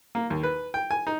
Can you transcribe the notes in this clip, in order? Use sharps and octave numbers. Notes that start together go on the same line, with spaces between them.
A#3
D#2
B4
G5
G#5
D#4